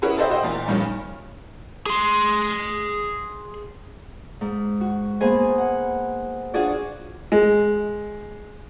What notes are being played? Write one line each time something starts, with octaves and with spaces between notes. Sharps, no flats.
C#4 E4 F#4 G#4 A#4 B4
A4 B4 C5 D#5 E5 G5
F#4 C5 D#5 G5
E2 A#2
G2 D#3 F3 C#4
G#4 C6
G#2
F#4
A#3 B3 G#4 C5 D#5 G#5
F#5
D4 F4 F#4 G#4 C#5 D5
G#3